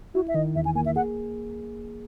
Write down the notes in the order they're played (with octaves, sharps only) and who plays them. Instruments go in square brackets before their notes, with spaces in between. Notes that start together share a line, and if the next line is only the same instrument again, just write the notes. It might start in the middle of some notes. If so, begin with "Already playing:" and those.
[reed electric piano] E4 [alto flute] F#4
[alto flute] E5
[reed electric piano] D#3 [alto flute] D#5
[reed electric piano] E2 [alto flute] E5
[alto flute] G#5
[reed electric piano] A#3 [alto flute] G#5
[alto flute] E5
[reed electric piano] G#4 [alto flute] F#5